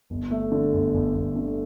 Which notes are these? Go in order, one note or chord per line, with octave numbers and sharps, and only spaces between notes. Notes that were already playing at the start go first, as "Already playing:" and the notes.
G1
A3
D3
G1
G1
G1
D3